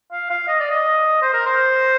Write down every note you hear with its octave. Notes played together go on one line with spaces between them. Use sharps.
F5
F5
D#5
D5
D#5
C5
A#4
C5